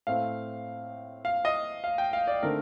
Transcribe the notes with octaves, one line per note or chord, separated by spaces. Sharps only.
A2 A3 C4 F5
F5
D#5
F5
G5
F5
D5
D3 A3 C4 D#4 A#4